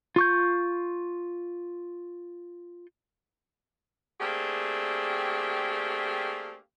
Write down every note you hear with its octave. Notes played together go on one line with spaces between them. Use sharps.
F4 C#6 G6
A3 A#3 C4 D4 G4 G#4